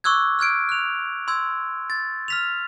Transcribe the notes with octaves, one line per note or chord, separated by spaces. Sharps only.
C#6 D6 E6 F#6 G#6
F6 F#6 G#6 D7
F#6 F7
C6 E6 G#6
A6
F6 B6 F7